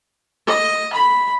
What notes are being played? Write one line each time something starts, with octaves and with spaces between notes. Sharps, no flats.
D#5
B5